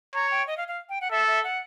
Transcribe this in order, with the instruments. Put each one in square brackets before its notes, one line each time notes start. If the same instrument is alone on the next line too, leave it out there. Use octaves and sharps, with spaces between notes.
[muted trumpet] C#5 [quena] A#5
[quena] G5
D#5
F5
F5
G5
F#5
[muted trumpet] A4 [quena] E5
[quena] E5
F#5